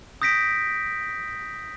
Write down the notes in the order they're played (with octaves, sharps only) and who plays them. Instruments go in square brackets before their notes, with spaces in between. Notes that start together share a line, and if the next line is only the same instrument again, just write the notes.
[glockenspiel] D#6 G6 A#6 B6 D7